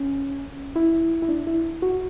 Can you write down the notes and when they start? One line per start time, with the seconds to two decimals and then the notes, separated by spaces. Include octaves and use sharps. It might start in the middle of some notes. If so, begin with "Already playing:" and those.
Already playing: C#4
0.76 E4
1.22 E4
1.29 D4
1.47 E4
1.82 F#4